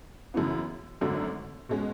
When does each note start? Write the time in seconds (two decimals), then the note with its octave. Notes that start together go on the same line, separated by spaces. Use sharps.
0.34 F#2 C#3 E3 B3
1.01 G#1 F#2 D3 F#3 A3
1.69 B2 G#3 C#4